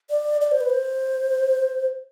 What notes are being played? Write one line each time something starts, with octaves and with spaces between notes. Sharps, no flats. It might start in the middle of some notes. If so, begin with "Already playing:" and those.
D5
D5
C5
B4
C5